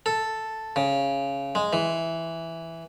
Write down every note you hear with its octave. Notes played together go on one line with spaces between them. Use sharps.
A4
C#3
G#3
E3